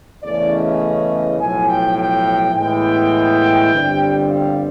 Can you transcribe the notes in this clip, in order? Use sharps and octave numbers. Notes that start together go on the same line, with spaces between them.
E2 C#3 E3 A3 C#4 D5
D#5
B1 A2 F3 G#5
G5
G5
A2 E3 G#3 B3 G5
G1 G2 D3 G3 C4
F5